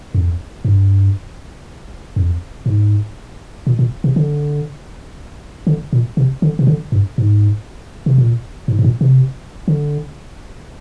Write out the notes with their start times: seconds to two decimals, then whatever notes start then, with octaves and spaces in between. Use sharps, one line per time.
0.14 F2
0.65 G2
2.16 F2
2.66 G#2
3.67 A#2
3.79 A#2
4.04 C3
4.16 D3
5.67 D3
5.93 A#2
6.17 C3
6.42 D3
6.59 C3
6.67 D3
6.92 G2
7.18 G#2
8.06 C3
8.18 A#2
8.68 G#2
8.79 G#2
8.84 A#2
9.01 C3
9.68 D3